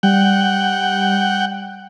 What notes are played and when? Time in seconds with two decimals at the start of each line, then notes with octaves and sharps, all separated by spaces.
0.03 G3 F#5 G5